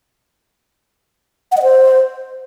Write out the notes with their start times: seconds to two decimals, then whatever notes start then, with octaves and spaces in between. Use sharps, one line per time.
1.52 F#5
1.57 D#5
1.63 C5